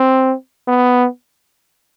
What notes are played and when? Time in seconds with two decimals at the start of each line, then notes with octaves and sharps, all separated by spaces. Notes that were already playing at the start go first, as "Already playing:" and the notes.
Already playing: C4
0.68 B3